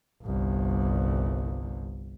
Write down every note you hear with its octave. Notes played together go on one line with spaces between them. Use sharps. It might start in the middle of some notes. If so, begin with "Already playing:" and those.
G1 C2